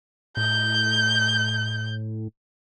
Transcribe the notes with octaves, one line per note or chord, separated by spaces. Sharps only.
A2 G6